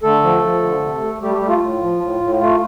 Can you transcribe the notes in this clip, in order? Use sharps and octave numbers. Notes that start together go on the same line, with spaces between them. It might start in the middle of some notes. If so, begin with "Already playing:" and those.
D3 A3 A4
F3
F3
D3
C3
A3
G3 A3 G4
G3 G4
A3
F4
A2
F3
A2
A2
A3 F4